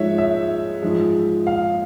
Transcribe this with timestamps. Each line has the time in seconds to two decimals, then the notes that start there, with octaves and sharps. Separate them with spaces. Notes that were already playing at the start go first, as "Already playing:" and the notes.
Already playing: G#2 F3 G#3 C#5 E5
0.18 E5
0.82 G#2 F3 G#3
1.47 F5